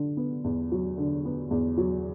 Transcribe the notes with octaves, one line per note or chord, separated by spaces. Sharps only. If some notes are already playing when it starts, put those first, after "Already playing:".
Already playing: D3
B3
E2
F#3
D3
B3
E2
F#3